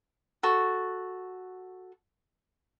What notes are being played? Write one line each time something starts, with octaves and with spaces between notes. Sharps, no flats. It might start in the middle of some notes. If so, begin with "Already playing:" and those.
F#4 A4 C#6